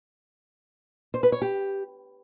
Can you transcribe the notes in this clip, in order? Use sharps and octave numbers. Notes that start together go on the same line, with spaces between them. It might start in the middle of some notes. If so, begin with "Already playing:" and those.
C5
B4
C#5
G4